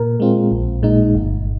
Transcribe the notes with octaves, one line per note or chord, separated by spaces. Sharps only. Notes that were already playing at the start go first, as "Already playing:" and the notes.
Already playing: A#2 A#4
G#3 C4 F4
A#1
A#2 G#3 D#4
G1